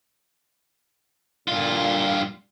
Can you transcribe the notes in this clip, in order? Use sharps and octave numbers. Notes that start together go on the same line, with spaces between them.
G2 A#2 F4